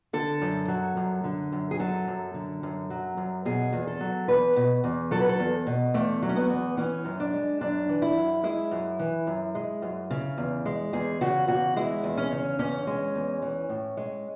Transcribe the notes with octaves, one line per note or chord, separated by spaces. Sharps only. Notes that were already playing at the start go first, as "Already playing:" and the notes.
D3 A4
F#2
F#3
F#2
D3
F#2
G#4
F#3 A4
F#2
D3
F#2
F#3
F#2
B2 G#4
E2
A4
F#3
E2 B4
B2
E2
F#3 A4
B4
A4
E2
B2
E2 A3
F#3
C#4
B3
E2
E3 C#4
F#2
D4
G#3
F#2 D4
E3
E4
F#2
G#3 E4
F#2
E3
F#2
G#3
F#2
C#3
E2
G#3
E2 G#4
C#3 F#4
E2 F#4
G#3 E4
E2
C#4
C#3
E2 C#4
G#3
E2
E3
A2
G#3